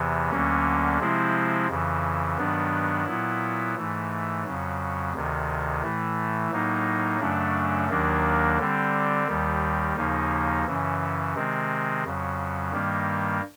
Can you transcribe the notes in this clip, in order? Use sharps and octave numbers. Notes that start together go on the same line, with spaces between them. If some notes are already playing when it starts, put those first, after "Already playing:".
Already playing: E2 C3 E3
D2 D3 F#3 A#3 C#4
C3 F3 G#3 C4 E4
F2 C#3 E3
G2 D#3 F#3 B3 D4
A#2 F#3 B3 E4
G#2 E3 A3
F2 C#3 F#3
D2 C3 D#3
A2 E3 A3
A2 F#3 A#3 D#4
F#2 C#3 F#3 A3 D4
D#2 D#3 F#3 A#3 D4
D3 G3 C4
D#2 D#3 G3
D#2 C#3 F3 A#3 D#4
F#2 C#3 E3
C3 D#3 G#3 C4
F2 C#3 F#3
G2 D#3 G3 A#3